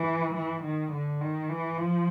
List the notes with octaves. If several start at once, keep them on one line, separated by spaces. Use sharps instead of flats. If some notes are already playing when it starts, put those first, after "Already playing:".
Already playing: E3
E3
D#3
D3
D#3
E3
F3